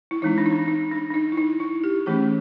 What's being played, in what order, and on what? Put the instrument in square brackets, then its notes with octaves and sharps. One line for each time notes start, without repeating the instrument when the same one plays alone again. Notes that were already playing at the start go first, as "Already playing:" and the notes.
[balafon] E4
E3 G#3 C4 D#4
D4
D#4
D4
D#4
D4
D4
D#4
E4
D#4
E4
G4
E3 A3 C#4 G#4